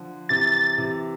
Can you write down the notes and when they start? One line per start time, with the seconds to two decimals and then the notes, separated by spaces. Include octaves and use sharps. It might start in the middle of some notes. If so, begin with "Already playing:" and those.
Already playing: D3 F3
0.29 C3 E3 A6
0.78 C3 E3